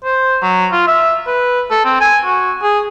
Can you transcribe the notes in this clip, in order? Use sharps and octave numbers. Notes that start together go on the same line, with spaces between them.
C5
F#3
F4
E5
B4
A4
C4
G#5
F#4
G#4